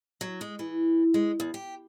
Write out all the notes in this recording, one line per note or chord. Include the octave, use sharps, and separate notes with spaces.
F#3
G#3
E3
G#3
E2
G4